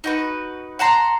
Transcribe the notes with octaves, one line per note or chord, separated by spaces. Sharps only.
D#4 F#4 B4
F#5 A5 A#5 C6